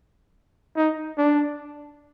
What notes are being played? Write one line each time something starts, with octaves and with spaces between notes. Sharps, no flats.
D#4
D4